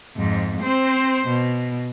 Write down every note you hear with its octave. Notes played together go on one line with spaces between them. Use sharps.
F2 G#2
C4 C5
B2